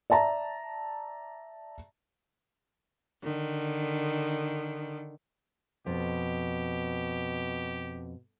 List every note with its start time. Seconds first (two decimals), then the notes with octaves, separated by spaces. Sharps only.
0.10 D5 E5 A5 A#5
3.22 D3 D#3
5.86 F2 B2 G4